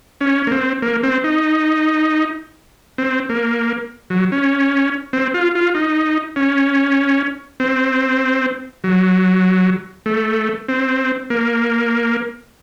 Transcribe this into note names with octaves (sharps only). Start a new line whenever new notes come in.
C#4
A#3
C4
A#3
C4
D#4
C4
A#3
F#3
C#4
C4
F4
F4
D#4
C#4
C4
F#3
A3
C4
A#3